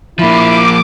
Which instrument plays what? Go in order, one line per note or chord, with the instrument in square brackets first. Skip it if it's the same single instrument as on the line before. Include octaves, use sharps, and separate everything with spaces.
[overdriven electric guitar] F3 A#3 [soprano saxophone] E4 [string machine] D6